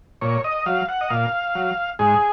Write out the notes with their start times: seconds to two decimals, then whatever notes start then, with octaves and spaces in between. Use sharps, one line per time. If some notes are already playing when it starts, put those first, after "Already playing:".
0.21 A#2 C#5
0.44 D#5
0.66 F#3 F5
0.89 F#5
1.01 D#5
1.10 A#2 F5
1.55 F#3
1.99 G#2 G#4